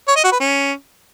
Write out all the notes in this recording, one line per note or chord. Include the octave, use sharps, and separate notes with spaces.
C#5
D#5
F#4
B4
C#4